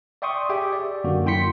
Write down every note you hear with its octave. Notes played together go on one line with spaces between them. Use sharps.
D5 E5 G5 C6 C#6 D#6
G4 G#4 E5 G5 G#5
D5
F#2 D3 A#3 F#4
F#2 E4 G5 C6 B6 C#7